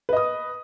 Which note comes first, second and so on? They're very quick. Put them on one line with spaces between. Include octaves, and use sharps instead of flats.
B4 D#5 D#6